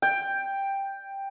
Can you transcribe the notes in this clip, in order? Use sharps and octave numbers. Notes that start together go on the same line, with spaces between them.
G5